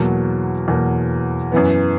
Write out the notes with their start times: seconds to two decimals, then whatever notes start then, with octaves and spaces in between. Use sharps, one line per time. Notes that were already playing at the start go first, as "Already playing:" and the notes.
Already playing: E2 B2 F#3 A#3
0.68 E2 B2 F#3 A#3
1.52 F#2 E3 B3